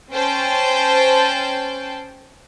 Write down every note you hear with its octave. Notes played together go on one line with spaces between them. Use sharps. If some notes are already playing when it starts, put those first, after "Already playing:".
C#4 C5 G5 A5